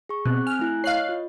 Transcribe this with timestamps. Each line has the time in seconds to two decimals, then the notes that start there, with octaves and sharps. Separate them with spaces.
0.09 G#4 C#6
0.26 B2 C4 F#6
0.47 G#5 F6
0.59 A3 E4 F#6
0.84 C#5 D#5 F5 F#6 C7
1.09 F4